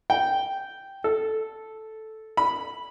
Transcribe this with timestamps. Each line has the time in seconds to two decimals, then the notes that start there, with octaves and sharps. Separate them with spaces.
0.10 G5
1.04 A4
2.37 B5